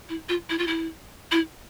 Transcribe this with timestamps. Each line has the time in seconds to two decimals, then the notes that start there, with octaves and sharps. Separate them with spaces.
0.09 E4
0.29 F4
0.49 E4
0.58 F4
0.67 E4
1.31 E4